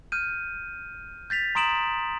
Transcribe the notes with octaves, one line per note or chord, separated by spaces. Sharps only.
F6 G6 D#7
G6 A6 B6 F7
A#5 C6 D#6 D7 E7 F#7